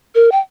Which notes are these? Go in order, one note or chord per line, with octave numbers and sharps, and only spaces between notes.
A#4
G5